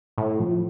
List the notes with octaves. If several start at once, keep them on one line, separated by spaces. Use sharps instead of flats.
A2
F3